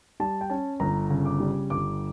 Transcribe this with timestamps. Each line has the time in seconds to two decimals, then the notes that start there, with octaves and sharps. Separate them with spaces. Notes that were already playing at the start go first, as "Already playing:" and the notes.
0.20 G3 A5
0.41 G5
0.50 C#4 A5
0.80 G1 A#5
1.10 C#3
1.25 D6
1.40 G3
1.70 G1 D6